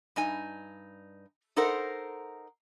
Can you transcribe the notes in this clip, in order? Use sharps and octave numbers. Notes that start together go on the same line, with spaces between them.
G2 D#4 G#5
D#4 A4 A#4 C5 F#5